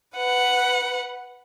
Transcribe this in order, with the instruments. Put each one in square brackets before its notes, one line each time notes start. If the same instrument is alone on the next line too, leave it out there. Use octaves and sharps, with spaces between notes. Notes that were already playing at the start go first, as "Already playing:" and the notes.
[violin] B4 F#5